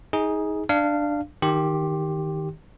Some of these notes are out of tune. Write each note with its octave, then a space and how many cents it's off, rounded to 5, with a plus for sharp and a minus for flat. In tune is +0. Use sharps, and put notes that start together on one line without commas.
D#4 +25 G#4 +0
D4 +10 F5 -15
D#3 +0 G4 +0 C6 +30